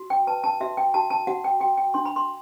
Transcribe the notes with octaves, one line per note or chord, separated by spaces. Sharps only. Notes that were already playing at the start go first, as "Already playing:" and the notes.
Already playing: F#4
G5
B4 A5
A5
F#4 E5
G5
F#4 A5
A5
F#4 F#5
G5
F#4 G5
G5
D4 C6
B5
C6